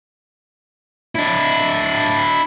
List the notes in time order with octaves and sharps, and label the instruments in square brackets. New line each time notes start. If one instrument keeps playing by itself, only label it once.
[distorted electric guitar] D4 E4